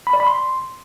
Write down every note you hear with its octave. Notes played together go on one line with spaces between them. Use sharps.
B5
D5
B5
C6